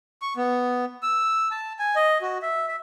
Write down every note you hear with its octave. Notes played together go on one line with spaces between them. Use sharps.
C#6
B3
E6
A5
G#5
D#5
F#4
E5
E5